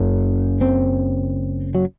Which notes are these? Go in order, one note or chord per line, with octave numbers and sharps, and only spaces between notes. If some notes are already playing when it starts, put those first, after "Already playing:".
Already playing: F#1 F#2 C#3
C4
F#3